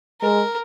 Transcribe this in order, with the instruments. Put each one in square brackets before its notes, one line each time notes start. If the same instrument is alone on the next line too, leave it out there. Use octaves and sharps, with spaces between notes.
[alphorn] G#3 [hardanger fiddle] A#4